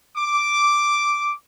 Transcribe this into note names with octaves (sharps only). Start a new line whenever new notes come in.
D6